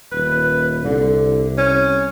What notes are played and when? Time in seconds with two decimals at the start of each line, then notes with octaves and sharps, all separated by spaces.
0.12 D#1 B4
0.85 C2 D3
1.58 C#4